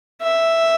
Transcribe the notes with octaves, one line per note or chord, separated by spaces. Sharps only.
E5